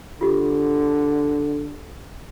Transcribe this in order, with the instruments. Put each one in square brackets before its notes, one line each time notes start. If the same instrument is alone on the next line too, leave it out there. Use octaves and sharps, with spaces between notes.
[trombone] D3 [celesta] F4 G4